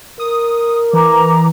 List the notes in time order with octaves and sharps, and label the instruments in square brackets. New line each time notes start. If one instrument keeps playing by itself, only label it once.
[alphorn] A#4 [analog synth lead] D#6
[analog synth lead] E3 [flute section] A#5 D6